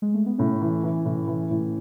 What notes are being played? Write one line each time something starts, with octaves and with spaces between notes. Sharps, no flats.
G#3
A3
B3
A2 A3 C#4
E3
E3
A2
E3
A2